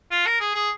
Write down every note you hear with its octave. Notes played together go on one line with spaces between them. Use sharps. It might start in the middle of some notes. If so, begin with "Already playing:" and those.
F4
A#4
G#4
G#4